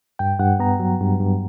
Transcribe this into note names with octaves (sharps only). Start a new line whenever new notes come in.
G2 G5
G2 F#5
B3 A#5
F#3
G2
G2